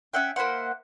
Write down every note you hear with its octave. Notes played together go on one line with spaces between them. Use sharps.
C#4 E5 F#5 G5
A#3 E4 C5 F#5